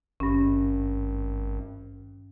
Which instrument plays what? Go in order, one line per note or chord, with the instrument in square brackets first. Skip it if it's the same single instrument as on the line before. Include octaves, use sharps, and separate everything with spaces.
[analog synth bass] G#1 [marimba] G2 C#4